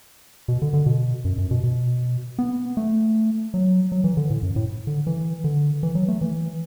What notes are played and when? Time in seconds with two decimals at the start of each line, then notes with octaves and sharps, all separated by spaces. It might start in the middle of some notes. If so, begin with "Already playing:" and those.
0.48 B2
0.62 D3
0.73 D3
0.86 B2
1.25 F#2
1.38 F#2
1.51 B2
1.63 B2
2.39 B3
2.77 A3
3.54 F#3
3.92 F#3
4.04 E3
4.17 D3
4.30 A2
4.43 F#2
4.56 A2
4.87 D3
5.07 E3
5.44 D3
5.83 E3
5.95 F#3
6.08 A3
6.21 E3